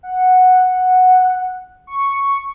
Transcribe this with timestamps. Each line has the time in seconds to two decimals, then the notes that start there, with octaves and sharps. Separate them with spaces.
0.03 F#5
1.87 C#6